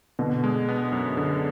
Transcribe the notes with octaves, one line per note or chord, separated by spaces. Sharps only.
B2 D3
G#3
B3
F#2
D3